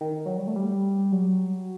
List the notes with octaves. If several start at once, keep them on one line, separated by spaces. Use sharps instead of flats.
D#3
F#3
G3
A3
G3
F#3